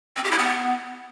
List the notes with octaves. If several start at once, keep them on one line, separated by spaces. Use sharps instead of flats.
C4
G4
E4
B3